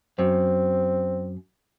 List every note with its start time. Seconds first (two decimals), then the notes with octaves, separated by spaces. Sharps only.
0.18 F#2 C4